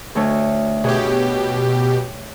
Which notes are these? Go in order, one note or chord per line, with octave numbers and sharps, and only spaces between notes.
D2 A3 C#5
B2 G4 G#4 C#5